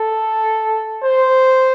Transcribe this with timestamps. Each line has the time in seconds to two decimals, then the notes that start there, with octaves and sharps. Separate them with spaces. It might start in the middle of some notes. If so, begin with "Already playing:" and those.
Already playing: A4
1.04 C5